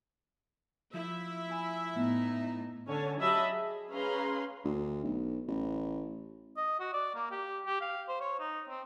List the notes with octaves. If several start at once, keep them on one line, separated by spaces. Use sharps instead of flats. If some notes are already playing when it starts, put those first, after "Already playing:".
F3 E4 E5
G#5 B5
A2 B3 D#4
D3 C#4 C#5 G#5 A5
F#3 G4 D#5 E5 A5 B5
G#4
C#4 G#4 B4 F5 A#5 C6
D2
B1
A1
D#5
F#4
D5
A#3
G4
G4
F5
C5
C#5
D#4
C4